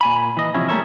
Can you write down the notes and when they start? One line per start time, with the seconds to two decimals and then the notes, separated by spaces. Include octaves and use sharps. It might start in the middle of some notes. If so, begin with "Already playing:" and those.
0.01 A#2 G#5 B5
0.37 E3 D#5
0.54 C3 F3 C#4 E4
0.69 G3 A3 A#3 C#4 C#5 E5